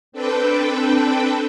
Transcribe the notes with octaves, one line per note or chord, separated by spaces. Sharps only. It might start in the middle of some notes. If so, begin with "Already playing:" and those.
C4 D4 A4 B4 G5